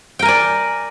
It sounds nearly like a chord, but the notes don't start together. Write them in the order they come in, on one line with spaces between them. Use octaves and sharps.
G5 A#4 G#5 D5